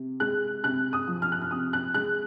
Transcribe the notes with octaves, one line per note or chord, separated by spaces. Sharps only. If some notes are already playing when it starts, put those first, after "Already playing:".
Already playing: C3
G#3 F#6
C3 F#6
D#6
F3
F6
F#6
F6
C3 D#6
F#6
G#3 F#6